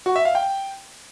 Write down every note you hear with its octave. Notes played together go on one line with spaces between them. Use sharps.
F#4
E5
F5
G5